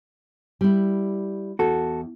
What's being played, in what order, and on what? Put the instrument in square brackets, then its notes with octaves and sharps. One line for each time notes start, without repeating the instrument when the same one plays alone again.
[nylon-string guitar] G3 E4
[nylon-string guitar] E2 [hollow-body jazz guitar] F#4 A4